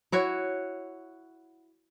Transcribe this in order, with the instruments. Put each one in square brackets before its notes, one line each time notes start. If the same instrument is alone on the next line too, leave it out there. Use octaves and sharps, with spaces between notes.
[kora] E4 F#4 C#5